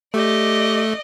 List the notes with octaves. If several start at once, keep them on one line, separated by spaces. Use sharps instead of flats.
A3 G4 D5 D#5